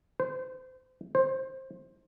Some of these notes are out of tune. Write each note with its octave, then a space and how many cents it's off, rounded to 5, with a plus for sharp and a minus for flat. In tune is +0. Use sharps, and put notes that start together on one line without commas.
C5 -30
C5 +15